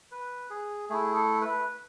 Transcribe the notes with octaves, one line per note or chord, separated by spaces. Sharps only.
B4
G#4
A3 E4 G#4
A4
B4